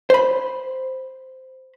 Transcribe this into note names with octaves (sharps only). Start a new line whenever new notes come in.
C5 B5